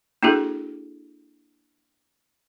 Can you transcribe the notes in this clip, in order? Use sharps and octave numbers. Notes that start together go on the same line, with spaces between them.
A#3 D4 E4 F#4 G#4 A4